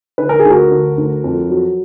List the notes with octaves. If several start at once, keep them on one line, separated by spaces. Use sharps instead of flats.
D3 B4
A#4
G#4
D2
F#4 A#4
D3
D2
F2
F#3